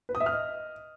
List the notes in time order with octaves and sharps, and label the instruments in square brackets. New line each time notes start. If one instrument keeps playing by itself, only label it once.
[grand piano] B4
D#6
E5
F6
D#5